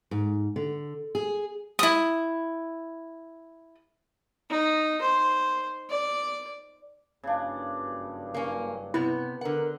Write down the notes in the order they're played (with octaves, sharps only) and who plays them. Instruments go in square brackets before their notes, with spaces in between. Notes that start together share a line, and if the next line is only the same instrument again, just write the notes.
[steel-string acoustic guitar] G#2
D3
G#4
[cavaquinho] E4 D#6
[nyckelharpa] D#4
C5
D5
[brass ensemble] F#1 G2 [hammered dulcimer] C#3 D4
[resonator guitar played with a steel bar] A#3 C#4
[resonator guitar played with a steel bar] C3 B3 [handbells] E4
[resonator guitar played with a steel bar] D3 F#5 [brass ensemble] A#4